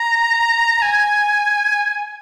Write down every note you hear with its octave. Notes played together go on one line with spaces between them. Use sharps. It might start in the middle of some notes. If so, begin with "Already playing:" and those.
Already playing: A#5
G#5